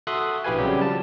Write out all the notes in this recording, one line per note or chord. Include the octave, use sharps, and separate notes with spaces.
F#4 A4 E5 C6 D#6 F#6
A#1 E4 G4 B4 F5 G#5
C#3 F#3 G3 C4 G4
F3 A5